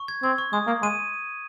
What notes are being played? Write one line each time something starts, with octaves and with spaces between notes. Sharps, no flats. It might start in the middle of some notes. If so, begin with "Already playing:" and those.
Already playing: C#6
G#6
C4 G#6
C#6
G#3 D#6
A#3 D#6
G#3 D#7